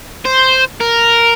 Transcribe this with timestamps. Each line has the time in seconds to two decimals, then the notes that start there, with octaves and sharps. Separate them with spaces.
0.25 C5
0.81 A#4